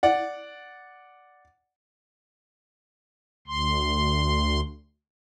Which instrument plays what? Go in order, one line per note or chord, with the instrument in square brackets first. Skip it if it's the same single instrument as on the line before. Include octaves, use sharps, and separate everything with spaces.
[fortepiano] D5 F#5
[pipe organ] D2 C6